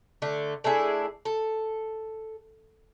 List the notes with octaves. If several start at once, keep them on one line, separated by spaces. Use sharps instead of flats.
D3 A3
A3 D4 E4 G#4
A4